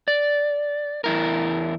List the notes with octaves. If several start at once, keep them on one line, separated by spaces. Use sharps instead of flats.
D5
E2 E4 A#4